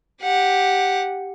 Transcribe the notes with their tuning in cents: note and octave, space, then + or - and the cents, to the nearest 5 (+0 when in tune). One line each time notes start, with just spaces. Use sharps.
G4 +0 F#5 -10